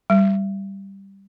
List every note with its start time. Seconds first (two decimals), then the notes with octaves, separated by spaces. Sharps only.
0.10 G3